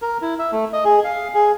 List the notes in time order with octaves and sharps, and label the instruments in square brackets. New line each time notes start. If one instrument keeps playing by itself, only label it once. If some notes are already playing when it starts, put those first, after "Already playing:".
[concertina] A#4
E4
E5
A3
D#5
G#4
F5
G#4